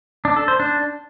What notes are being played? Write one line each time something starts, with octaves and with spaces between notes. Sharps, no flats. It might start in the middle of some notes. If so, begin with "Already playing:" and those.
D4
A4
C5
D4